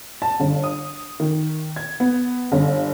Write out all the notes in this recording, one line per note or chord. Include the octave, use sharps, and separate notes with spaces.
A5
G1
D#6
D#3
G#6
B3
G1